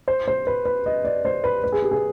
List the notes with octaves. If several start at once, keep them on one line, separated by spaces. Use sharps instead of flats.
C5
C5
B4
B4
D#5
D5
C5
B4
B4
G#4
G4
G#4